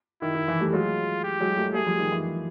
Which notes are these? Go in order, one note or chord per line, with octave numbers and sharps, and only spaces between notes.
D#3 E4
D#3
E3
G3 A3
F#3 G#3 F4
G4
F#3 G#3
G3 A3
G3 A3 G#4
F3 G3
D#3
E3